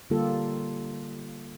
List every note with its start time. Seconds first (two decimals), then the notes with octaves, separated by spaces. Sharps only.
0.10 D3 G3 A#3 F4 G4 A4